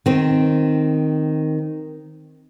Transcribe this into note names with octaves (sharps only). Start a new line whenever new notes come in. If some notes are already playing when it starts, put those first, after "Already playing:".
D#3 C4